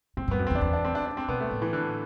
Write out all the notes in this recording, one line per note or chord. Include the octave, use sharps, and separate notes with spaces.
A2 C4
G2 B3
F#2
E2 C4
D4
E2 C4
D4
C4
D4
D4
C4
B2 B3
A3
A2
E3
D3